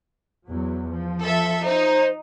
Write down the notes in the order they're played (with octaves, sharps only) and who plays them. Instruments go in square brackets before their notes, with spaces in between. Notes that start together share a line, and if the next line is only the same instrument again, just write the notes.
[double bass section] E2 F#3
F3
[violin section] A4 E5
[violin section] D#4 [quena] C5